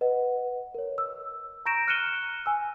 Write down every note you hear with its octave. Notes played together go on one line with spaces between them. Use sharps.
B4 D#5 F#5
A#4 C#5
E6
A#5 C#6 G6 A#6 D7 E7
F6 F#6 C#7 D#7 E7 G7
G#5 E6